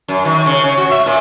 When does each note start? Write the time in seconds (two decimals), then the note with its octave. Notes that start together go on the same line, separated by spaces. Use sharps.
0.08 F#2
0.25 D#3
0.46 C#3
0.64 C#3
0.78 F#4
0.91 E5
1.06 A#2